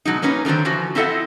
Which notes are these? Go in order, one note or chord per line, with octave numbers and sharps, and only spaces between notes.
B2 F#3 G#3 D#4
A#3 C#4 D#4 B4
D3 D#3 F#3 D4 C5
E3 F3 F#4
C4 E4 F4 A4 D#5 F#5